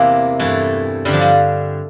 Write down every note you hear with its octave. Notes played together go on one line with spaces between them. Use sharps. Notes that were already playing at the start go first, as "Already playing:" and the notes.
Already playing: E2 C3 E3 A#3
G2 E3 A3
G2 D3 G3
F3
G3